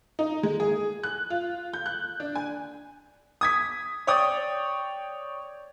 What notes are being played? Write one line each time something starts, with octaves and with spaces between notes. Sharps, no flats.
D#4
G#3
G#4
F#6
F4
G6
F#6
D4
G#5
D#6 G#6 B6
C#5 D5 G5 D#6